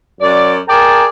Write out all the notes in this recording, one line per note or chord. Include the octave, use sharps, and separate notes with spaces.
F#2 D5
G#4 A#4 D5 G5 A5